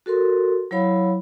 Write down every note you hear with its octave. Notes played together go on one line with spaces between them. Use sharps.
F#4 A4 A#4 C6
F#3 E4 C5 C#5 F5 B5